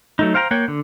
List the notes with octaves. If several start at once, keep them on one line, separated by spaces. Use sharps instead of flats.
F#3 A3 D#4
C5 F5 G5 A5 A#5
A#3 C#5 F#5 G5
D3